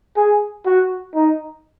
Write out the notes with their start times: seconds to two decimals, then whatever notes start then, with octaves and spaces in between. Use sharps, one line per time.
0.17 G#4
0.66 F#4
1.15 D#4